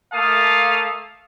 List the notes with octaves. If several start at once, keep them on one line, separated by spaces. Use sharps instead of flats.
A3 A#3 F5 A5 D#6